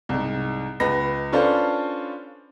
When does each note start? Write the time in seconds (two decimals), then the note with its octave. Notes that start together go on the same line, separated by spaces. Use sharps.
0.09 C2 G#2
0.80 C#2 B4 A#6
1.32 C#4 D4 F4 A4 B4 C5